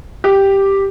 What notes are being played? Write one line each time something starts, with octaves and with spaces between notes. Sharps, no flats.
G4